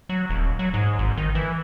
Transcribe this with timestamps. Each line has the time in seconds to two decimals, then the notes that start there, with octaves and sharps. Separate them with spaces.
0.09 F#3
0.29 D#1
0.59 F#3
0.74 G#2
0.99 G#1
1.18 D#3
1.35 E3